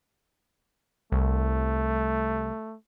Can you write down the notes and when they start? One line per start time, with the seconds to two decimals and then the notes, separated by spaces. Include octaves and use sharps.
1.12 C2 A3